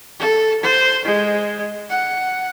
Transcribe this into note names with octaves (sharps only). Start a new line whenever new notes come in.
A4
C5
G#3
F#5